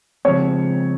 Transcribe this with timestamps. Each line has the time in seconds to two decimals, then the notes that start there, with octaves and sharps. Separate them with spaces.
0.25 C#3 F3 G#3 C4 C#5